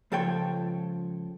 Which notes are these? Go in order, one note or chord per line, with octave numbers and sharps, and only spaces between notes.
C#2 F3 A4 C#5 G5